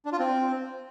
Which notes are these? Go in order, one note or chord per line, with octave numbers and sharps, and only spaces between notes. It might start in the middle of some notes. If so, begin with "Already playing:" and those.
D4
F4
C4